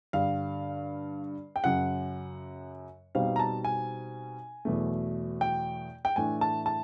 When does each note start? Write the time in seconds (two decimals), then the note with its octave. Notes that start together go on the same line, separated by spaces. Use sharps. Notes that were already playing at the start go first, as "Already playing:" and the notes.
0.13 G2 D3 G3 F5
1.56 G5
1.64 F#2 C#3 F#3 F#5
3.15 B2 G3 C4 D#4 F5
3.36 A#5
3.39 A5
3.65 G#5
4.65 E2 B2 F#3 A3
5.41 G5
6.05 G5
6.16 A2 E3 A3 D4 G#5
6.41 A5
6.66 A5